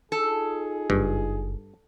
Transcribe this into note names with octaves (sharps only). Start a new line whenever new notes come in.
D#4 F4 G#4 A4
F#1 G2